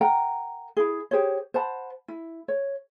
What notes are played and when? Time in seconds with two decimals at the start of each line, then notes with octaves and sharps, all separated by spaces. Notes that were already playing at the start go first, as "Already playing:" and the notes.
0.01 A#4 F#5 G5 A#5
0.77 E4 G#4
1.11 G4 G#4 C5 C#5
1.54 C5 F#5 A5 B5
2.08 E4
2.48 C#5